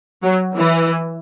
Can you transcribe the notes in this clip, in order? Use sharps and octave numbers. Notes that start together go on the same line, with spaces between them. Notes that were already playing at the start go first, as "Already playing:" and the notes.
F#3
E3